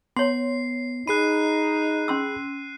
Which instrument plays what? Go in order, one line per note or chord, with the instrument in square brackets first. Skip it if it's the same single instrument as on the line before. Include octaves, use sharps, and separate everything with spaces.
[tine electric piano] B3 [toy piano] C#5 C6 [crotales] C7
[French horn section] D#4 [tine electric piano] G#4 B5 [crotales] F#6 C7 D#7
[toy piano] C#4 C6 E6